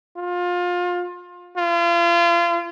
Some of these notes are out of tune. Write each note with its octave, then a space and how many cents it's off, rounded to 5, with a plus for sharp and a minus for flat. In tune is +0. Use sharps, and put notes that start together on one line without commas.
F4 +25
F4 -35